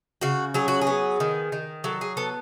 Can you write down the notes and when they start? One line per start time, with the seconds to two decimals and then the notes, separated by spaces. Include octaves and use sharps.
0.21 C#3 F#4
0.54 F#3 G#4
0.68 F#4
0.81 G#4
0.87 B3
1.20 D#3
1.52 D#3
1.84 F#3 A4
2.01 G#4
2.17 B3 A4